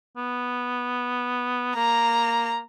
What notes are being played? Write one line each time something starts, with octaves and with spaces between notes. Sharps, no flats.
B3
A#3 A#5